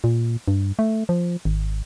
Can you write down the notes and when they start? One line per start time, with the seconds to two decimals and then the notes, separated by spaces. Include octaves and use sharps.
0.04 A#2
0.48 G2
0.79 A3
1.09 F3
1.45 G#1